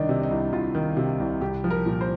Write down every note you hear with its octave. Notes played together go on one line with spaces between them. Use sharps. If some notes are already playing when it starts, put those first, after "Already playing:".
Already playing: C2 D#3 D4 D#4
C3
D#4
C2
C2 F4
D#3
C3
C2
C2 G4
F3
A#4
A#2
C5